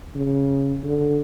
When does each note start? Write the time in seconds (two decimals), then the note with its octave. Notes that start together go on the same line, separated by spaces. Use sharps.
0.15 C#3
0.84 D3